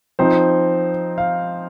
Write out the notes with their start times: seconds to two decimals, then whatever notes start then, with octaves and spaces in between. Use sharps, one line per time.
0.19 F3 C4 D#4 C5
1.18 F5